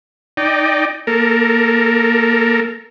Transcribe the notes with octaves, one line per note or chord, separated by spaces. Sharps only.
D#4 D5 G5
A#3 A4 A#4